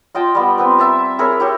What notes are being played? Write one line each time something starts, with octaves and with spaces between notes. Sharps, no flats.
F4 D#5 G5 A5
G3 B3
B3 C4 B4
E5 A5 A#5
E4 G#4 A#4 C#5
E4 G4 C#5